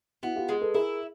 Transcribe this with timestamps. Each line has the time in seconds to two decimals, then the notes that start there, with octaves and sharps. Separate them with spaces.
0.23 B3 E4 F#4
0.36 F4 G4
0.49 G#3
0.61 A4 B4
0.74 E4 G#4 A#4